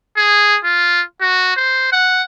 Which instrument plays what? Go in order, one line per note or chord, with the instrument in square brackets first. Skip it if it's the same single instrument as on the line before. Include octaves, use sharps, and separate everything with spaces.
[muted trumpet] G#4
F4
F#4
C5
F#5